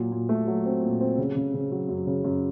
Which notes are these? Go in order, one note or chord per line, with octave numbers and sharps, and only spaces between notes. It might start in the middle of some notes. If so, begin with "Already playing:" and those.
Already playing: A#2 F#3
A#2
A3
F#3
C4
A#2
C4
C#3
C#3
C#3
F#3
F#2
C#3
F#2